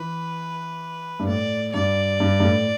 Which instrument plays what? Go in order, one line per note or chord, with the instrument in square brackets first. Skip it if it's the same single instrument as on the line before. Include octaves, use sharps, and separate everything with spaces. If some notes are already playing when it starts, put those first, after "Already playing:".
Already playing: [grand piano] E3 [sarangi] B4
[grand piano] G2
[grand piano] A2 [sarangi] D5
[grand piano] G2 [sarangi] D5
[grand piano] G2
G2
A2